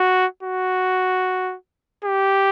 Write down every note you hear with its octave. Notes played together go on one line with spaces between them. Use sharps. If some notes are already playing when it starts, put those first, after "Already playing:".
Already playing: F#4
F#4
G4